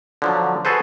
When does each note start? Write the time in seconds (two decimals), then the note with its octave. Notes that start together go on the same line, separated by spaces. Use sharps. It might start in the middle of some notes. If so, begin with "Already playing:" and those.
0.22 D3 F3 F#3
0.65 F#4 G#4 A4 B4 C5